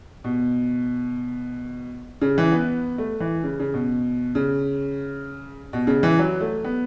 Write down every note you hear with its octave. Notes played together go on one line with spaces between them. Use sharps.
B2
C#3
E3
B3
A3
E3
C#3
C#3
B2
C#3
B2
C#3
E3
F#3
A3
B3